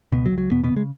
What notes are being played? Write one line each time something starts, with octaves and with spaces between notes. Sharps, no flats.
C#2 B2 B3
F#3
C#2
F#3
E2 B2 B3
B2 B3
C#3
G#3